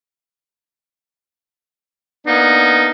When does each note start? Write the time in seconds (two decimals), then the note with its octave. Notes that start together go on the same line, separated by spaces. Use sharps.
2.27 A#3 B3 D4 D#4